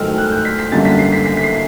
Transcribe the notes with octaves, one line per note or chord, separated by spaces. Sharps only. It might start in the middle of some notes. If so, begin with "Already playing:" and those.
Already playing: G#2 D#3 F#3 A3 E6 F6
F#6
G6
B6
B6
F#2 D3 G3 A#3 A6
B6
C7
B6
B6
B6
C7